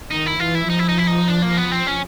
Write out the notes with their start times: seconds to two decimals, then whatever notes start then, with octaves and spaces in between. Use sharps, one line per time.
0.11 D#3 D#4
0.26 E4
0.40 E3 F4
0.55 E4
0.70 F3 D#4
0.79 E4
0.89 D#4
0.98 E4
1.07 D#4
1.28 D4
1.42 A#3
1.57 B3
1.72 C4
1.87 C#4